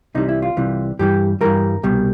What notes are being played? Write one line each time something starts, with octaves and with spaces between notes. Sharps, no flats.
C2 C3 E3 G3 D#4
E4
F4
C2 C3 E3 G3
G2 E3 G3 G4
G2 E3 G3 A#4
C2 B2 G3